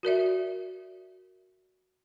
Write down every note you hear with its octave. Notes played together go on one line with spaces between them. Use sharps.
F#4 A#4 D5 E5